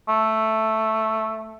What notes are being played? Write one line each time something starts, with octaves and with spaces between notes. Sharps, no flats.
A3